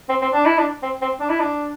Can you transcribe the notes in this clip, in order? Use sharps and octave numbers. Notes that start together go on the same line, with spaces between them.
C4
C4
D4
E4
D4
C4
C4
D4
E4
D4